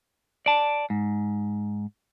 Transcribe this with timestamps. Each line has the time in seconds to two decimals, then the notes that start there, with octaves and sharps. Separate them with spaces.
0.46 D5 A5
0.90 G#2